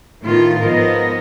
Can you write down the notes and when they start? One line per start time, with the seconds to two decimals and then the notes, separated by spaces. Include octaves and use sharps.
0.23 A2 D#3 B3 F4
0.62 G#2 F3 B3 A#4 D#5